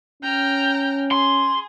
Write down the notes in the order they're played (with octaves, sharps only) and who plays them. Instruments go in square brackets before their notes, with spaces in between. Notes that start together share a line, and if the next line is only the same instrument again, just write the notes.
[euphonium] C#4 [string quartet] G5 A#5 F6
[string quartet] G#4 [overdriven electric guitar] C6